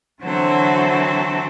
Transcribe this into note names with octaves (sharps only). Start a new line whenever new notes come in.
D3 E3 F#3 C4 F#4 A4